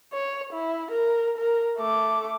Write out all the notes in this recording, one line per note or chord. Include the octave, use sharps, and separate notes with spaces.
C#5
E4
A#4
A#4
A3 D6